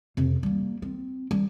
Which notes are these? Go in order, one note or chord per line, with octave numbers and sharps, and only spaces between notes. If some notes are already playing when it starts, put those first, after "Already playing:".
F2 C3
G3 A#3
C4
G3